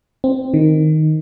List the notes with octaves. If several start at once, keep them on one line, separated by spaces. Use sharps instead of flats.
C4
D#3